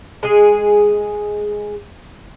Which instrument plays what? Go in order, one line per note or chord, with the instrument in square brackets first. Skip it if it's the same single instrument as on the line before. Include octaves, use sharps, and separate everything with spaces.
[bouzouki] G#3 G#4